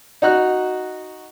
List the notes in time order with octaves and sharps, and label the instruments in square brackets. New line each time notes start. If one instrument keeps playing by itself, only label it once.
[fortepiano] D#4 F#4 F#6